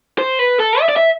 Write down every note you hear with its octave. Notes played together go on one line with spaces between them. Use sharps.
C5
B4
A4
E5
D5
E5